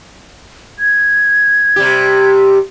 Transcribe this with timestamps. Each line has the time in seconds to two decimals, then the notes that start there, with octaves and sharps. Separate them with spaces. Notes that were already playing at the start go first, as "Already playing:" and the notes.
0.79 G#6
1.76 C3 G3 G4